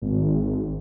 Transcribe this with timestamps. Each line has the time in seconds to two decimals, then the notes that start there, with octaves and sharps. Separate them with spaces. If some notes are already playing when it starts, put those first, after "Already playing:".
0.02 G#1